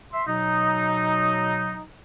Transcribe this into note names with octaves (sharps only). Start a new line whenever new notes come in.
E5 C6
B2 F#3 D#4